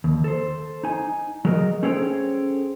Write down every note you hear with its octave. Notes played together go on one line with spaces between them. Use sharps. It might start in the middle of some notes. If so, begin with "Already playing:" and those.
D#2
A4 C5
D#4 G#5
F#3 G#4 A#4 D#5
C#4 G#4 A4 C5 C#5 G5